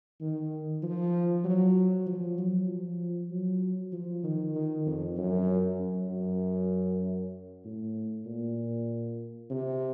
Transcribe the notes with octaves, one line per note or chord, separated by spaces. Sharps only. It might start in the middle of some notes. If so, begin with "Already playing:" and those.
D#3
F3
F#3
F3
F#3
F3
F#3
F3
D#3
D#3
F2
F#2
F#2
F#2
A2
A#2
C3